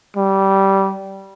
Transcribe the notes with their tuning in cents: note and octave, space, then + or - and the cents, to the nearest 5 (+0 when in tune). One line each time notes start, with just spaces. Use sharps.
G3 -15